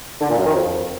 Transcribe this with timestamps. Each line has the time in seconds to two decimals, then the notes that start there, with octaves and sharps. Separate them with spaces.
0.21 D3
0.29 A#2
0.38 F#2
0.46 D#3
0.54 F2